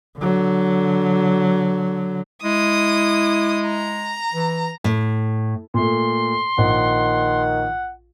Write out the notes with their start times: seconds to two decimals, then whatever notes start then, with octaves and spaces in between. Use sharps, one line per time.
0.18 D3 F#3
2.44 G#3 E4 D#6
3.67 A#5
4.34 E3
4.84 A2
5.74 A#2 A3 C6
6.58 A#1 D#3 F#5